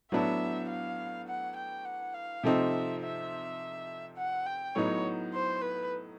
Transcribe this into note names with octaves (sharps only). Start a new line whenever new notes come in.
A2 F#3 B3 D4 E5
F5
F#5
G5
F#5
F5
C3 F3 A3 C4 D#4 E5
E5
F#5
G5
A2 F#3 B3 D#4 C#5
C5
B4